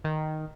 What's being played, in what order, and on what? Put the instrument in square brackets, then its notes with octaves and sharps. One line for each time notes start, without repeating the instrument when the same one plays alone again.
[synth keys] D#3